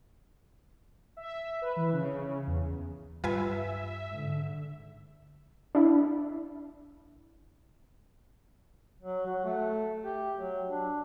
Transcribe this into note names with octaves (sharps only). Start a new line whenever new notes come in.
E5
B4
E3
C#3
E2
G2 G3 F4 B4 E5 G#5
G#2 D3
D4 E4
F#3
F#4
A3
G4
F#3
D4